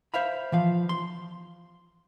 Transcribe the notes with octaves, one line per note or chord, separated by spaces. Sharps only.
C5 E5 F5 B5
E3 F3 F5
C6